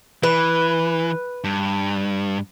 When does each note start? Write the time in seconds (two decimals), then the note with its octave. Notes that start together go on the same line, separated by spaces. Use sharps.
0.23 E3 B4
1.44 G2